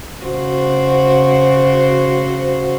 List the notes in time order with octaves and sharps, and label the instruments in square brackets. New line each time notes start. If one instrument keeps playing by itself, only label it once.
[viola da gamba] C#3 F#4 C5